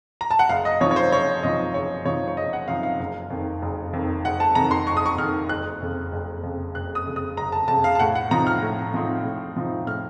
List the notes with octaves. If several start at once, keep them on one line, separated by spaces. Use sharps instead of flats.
A#5
A5
F#5
F#1 F5
D#5
F#2 F3 C4 D#4 C#5
C#5
C5
F#1 C#5
F#2 F3 C4 D#4 D#5
F#1 C#5
F#2 F3 C4 D#4 C#5
C#5
F#1 D#5
F#5
F#2 F3 C4 D#4 F5
F5
F#1
F2 D#3
F#1
F2 D#3
F#1 F#5
A5
F2 D#3 A#5
C6
F#1 C#6
D#6
C#6
F2 D#3 F6
F#1 F#6
F2 C#3
F#1
F2 C#3
F#1 F#6
D#6
F2 C#3
D#6
F#1 A#5
A5
F2 C#3 A5
F5
A5
A2 F#5
F#5
F3 C4 D#4 A#5
F6
A2
F3 C4 D#4
A2
F3 C4 D#4
A2 F6